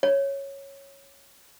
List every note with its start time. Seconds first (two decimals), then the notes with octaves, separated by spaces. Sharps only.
0.03 C#5